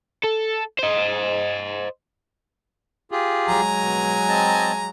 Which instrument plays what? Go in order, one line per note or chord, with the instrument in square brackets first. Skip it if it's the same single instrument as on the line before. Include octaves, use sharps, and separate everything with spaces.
[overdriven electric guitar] A4
C5 D#5
[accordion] F4 G4 G#4
[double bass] F#3 G#3 [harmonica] G#5 A#5
[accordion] B2
C4 D#5 A5